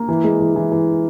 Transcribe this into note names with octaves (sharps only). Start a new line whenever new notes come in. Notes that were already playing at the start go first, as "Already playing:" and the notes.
Already playing: A#3
E3
G#3
E3
E3
E3